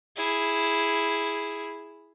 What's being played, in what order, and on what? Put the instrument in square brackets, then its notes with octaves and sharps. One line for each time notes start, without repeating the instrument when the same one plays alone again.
[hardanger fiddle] E4 G#4